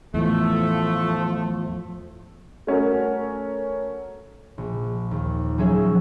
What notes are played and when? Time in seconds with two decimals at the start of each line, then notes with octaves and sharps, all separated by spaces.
0.14 E2 A2 F3 A3
2.67 A3 C#4 F#4 A#4
4.58 A#1
5.11 D#2
5.58 F3 F#3 C#4 G#4 E5